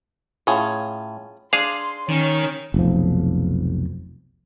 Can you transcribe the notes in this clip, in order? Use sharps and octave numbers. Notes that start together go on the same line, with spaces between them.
A2 C#4 F4 G#4
D4 G#4 F5 C6
D#3 C#4 C#5
F1 B1 F3